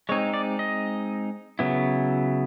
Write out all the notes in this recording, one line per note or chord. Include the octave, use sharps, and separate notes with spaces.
G#3 C4 D#4 C#5
D5
D#5
C#3 F#3 B3 E4